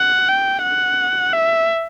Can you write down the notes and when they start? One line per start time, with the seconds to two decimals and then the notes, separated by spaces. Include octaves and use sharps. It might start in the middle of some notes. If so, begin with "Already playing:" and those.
Already playing: F#5
0.29 G5
0.63 F#5
1.34 E5